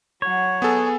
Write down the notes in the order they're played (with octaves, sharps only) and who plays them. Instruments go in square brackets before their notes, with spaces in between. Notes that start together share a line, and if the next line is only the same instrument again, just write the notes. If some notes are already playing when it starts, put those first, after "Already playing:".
[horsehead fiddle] F#3 F#5 [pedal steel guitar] C#5
[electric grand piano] B3 A4 [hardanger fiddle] G#4